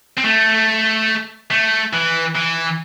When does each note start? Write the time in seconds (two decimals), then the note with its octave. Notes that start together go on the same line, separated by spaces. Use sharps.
0.18 C4
0.25 A3
1.51 A3
1.93 E3
2.35 E3